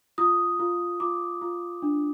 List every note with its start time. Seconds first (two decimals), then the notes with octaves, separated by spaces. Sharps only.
0.18 F4 D#6
0.60 F4
1.00 F4 D6
1.42 F4
1.82 D4